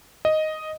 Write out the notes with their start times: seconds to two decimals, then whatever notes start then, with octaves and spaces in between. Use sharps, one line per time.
0.25 D#5